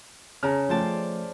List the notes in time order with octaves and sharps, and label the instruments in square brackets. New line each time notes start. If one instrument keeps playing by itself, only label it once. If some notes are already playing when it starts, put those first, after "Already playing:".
[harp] C#3 [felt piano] A5 A#5 F6
[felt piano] F3 A3 G5 [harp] C5 D5 A5